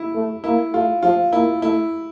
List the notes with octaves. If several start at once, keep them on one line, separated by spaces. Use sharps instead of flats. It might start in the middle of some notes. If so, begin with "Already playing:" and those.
Already playing: E4
A3
A#3 E4
A3 F4
F3 F4
A#3 E4
A3 E4